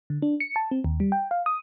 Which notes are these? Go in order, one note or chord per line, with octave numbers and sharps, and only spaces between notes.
D3
D4
C#7
A5
C4
D#2
G3
G5
F5
D#6